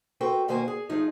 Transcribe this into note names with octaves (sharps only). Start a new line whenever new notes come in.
F#4 A4 B4 C5 G5
B2 D#3 A#3 F#4 C5 G#5
G#4
F3 A3 D#4 G#4